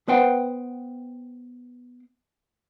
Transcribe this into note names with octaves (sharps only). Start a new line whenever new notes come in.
B3 B4 C5 F#5 G5